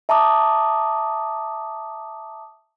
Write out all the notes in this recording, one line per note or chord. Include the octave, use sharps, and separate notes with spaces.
E5 A5 A#5 D6 D#6